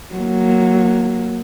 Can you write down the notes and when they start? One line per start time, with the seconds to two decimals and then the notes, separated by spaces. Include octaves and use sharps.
0.14 F#3 A#3